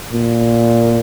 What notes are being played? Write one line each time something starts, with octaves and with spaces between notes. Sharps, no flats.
A#2